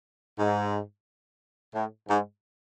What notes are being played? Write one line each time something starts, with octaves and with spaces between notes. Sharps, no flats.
G#2
A2
G#2